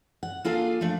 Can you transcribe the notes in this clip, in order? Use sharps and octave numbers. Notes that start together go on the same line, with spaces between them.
F#5
A#3 D4 F4 G#4 A4 F5
F3 A3 D4